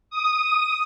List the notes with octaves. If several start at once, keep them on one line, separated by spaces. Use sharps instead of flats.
D#6